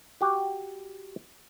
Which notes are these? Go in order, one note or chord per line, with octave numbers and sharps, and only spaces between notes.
F#4 G4 F#5